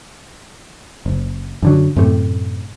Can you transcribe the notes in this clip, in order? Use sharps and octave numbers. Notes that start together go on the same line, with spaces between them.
F#1
F#2 D3 F#3
F#2 A2 C3 A3